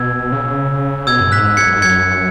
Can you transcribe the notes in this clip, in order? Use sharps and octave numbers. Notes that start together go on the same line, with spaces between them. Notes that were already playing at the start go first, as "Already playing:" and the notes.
Already playing: B2 E6 G#6
C#3
B2 E6 G#6
F#2
G#2 F#6 B6
F#2 G#6 C#7
G#2
F#2 G#6 C#7